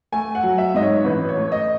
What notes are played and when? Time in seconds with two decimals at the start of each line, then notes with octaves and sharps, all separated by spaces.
0.12 A3 G#5
0.35 F#5
0.43 F#3
0.58 E5
0.74 G#2 D#5
0.82 C#5
1.04 A1 B4
1.29 C#5
1.36 A3
1.52 D#5